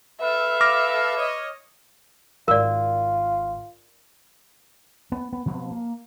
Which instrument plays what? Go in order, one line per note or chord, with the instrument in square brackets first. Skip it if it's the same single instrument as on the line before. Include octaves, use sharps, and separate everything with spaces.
[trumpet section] A4 F5 [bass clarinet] B4 [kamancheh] E5
[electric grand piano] D6 F6 A#6
[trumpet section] C#5 D#5
[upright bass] G#1 [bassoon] F4 [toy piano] A#4 D5
[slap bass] B3
B3
B2 F3 B3 C4
A#3